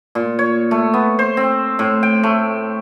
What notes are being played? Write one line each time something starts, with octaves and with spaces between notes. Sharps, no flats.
A#2
C#5
A3
B3
C5
C4
A2
G5
A3